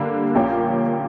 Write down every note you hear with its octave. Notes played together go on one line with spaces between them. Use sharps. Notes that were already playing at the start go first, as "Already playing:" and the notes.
Already playing: D3 G3 A#3 D4
A#1 A#2 A#3 C#4 G4